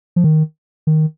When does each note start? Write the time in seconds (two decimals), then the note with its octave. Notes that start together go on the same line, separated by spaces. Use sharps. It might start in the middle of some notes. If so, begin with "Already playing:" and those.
0.16 F3
0.24 D#3
0.87 D#3